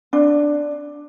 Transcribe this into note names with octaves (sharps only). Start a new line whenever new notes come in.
D4